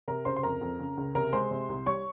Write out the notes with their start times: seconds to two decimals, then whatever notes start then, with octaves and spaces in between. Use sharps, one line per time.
0.08 C3 A#4 A#5
0.25 C#2 C5 C6
0.36 C6
0.43 F2 A#4 A#5
0.61 F2
0.79 C#3
0.97 C#2
1.15 C3 A#4 A#5
1.33 G#3 C5 C6
1.51 C3
1.69 C2
1.86 G3 C#5 C#6